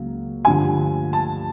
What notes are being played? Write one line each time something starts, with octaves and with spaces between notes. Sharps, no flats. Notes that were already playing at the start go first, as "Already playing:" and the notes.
Already playing: C#2 C#3 F#3 A#3
G2 D3 F3 A3 G#5
A5